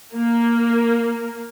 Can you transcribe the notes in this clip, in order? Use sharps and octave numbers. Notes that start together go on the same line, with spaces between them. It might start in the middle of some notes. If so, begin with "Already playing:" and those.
A#3